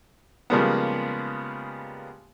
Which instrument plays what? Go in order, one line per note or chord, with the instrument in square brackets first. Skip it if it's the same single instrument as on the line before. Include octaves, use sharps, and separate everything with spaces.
[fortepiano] C#3 F3 G3 G#3 A#3 B3